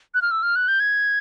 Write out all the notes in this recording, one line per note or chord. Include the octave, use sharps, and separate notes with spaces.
F#6
F6
E6
F6
F#6
G6
G#6